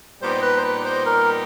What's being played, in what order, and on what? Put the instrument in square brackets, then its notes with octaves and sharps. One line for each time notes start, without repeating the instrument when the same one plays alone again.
[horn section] A#2 G3 B3 D#4 G4 [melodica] C5
[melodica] B4
C5
B4
C5
A#4